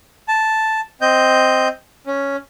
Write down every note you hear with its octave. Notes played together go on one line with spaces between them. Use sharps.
A5
C4 D#5 G6
C#4